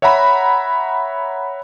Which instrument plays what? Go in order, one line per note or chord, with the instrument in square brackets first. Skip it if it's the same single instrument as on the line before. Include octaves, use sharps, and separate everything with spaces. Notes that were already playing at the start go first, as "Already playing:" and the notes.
[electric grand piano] C#5 E5 F#5 A#5 B5